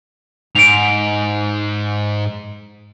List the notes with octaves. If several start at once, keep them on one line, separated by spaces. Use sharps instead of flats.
G#2 D7 F7